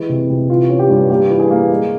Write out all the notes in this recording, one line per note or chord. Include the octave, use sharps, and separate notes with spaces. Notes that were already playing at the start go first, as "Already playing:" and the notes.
Already playing: E3 G#3
C3
C3
E3 F4
C#4
G4
G2
A#3 G4
E3
G#4
A#3
G#3